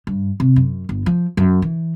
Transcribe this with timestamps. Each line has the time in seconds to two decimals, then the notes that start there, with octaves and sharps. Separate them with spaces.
0.07 G2
0.40 C3
0.56 F#2
0.89 G1
1.06 F3
1.37 F#2
1.62 E3